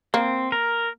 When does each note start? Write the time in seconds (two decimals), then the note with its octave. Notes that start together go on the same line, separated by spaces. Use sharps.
0.14 A#3 C4
0.52 A#4